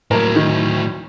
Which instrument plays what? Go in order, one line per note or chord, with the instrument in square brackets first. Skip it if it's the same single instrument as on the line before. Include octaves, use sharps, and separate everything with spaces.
[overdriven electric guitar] A2 F#3 [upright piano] A#3 A#4
[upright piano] D#3